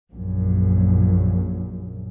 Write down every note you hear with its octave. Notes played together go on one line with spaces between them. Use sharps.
A#1 F#2